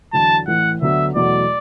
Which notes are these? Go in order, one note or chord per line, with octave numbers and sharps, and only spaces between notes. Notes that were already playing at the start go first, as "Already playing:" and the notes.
E2 D3 F#3 A5
A1 A2 E3 F#5
D2 D3 F#3 B3 E5
E2 B2 F#3 A3 D5